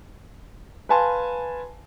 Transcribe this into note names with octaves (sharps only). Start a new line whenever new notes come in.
B4 F5 G#5 A5 C6